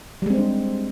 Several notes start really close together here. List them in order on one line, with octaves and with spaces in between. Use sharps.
G3 G#3 C4 C5 D4